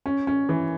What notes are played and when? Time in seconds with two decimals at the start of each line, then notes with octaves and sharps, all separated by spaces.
0.06 C#4
0.27 C#4
0.49 E3